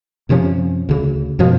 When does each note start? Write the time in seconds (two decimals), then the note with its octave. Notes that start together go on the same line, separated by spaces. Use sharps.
0.29 F#2 C3 F3 C#4
0.89 D2 C#3
1.39 F#2 B2 F3